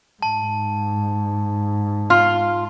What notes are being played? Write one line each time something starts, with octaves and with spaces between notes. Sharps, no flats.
G#2 A5
F4 C6 F6